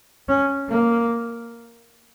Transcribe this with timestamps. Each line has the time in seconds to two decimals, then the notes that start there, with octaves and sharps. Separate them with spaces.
0.29 C#4
0.69 A#3